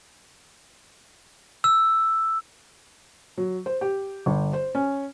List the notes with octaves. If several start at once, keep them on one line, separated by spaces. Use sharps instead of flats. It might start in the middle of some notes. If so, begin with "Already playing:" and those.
E6
F#3
C5
G4
G1
C5
C#4